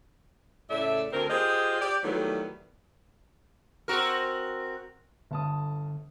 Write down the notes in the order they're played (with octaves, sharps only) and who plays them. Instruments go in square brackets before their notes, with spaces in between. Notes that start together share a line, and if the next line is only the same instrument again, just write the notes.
[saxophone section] A2 C#3 A3 D5 E5
D2 D3 C4 A#4
F4 G4 G#4 C5 D#5
G4 D5
D#3 E3 F#3 G3 A3 B3
[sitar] C4 F#4 A#4
[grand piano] G1 A5 D#6 [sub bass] D3